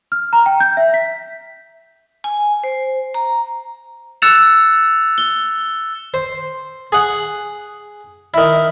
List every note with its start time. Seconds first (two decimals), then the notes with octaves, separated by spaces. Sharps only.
0.12 F6
0.33 A#5
0.46 G5
0.60 G6
0.77 E5
0.94 B6
2.24 G#5
2.64 C5
3.14 A#5
4.22 E6 F#6 A6 C#7 E7 F7
5.18 G7
6.14 C5
6.92 G#4 F#5
8.34 D#3 E4